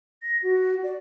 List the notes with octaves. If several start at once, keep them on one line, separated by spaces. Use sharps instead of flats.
A#6
F#4
D5